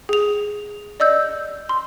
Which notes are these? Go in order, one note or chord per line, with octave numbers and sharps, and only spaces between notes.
G#4 F7
D5 D#5 E6 G6
C6